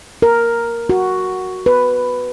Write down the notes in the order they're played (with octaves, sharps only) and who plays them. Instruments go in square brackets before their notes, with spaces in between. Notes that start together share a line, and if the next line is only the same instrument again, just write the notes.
[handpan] A#4
F#4
B4